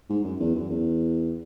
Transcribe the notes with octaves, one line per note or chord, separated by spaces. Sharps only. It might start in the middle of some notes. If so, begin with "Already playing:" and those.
G#2
F#2
E2
F#2
E2